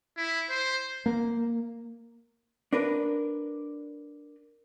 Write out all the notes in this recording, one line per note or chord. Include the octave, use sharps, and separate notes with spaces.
E4
C5
A#3
D4 A#4 B4